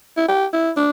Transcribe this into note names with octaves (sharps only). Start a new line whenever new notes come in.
E4
G4
E4
D4